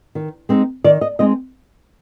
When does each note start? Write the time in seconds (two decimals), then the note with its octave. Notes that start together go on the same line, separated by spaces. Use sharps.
0.15 D#3
0.49 G#3 C4 D#4
0.84 D#3 D5
1.01 D#5
1.19 G#3 C4 D#4 D#5